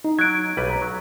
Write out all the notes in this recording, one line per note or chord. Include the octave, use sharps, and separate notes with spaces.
D#4
F#3 F#6 G#6 D7
B1 G3 B4
A#5
F#3